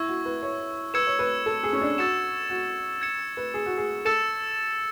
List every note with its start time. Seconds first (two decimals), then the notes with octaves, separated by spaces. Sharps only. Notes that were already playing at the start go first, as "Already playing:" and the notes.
Already playing: E4 C#6 E6 G#6
0.08 F#4
0.25 B4
0.43 C#5
0.94 B4 E6 G#6 C#7 E7
1.07 C#5
1.19 B4
1.46 A4
1.63 G#4
1.73 C#4
1.81 D4
1.98 F#4 E6 A6 C#7 E7
2.50 F#4
3.02 G#6 C#7 E7
3.37 B4
3.54 G#4
3.66 F#4
3.77 G#4
4.05 A4 E6 A6 C#7 E7